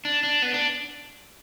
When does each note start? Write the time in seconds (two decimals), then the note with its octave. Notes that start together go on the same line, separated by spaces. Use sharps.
0.05 D4
0.23 D4
0.42 B3
0.54 D4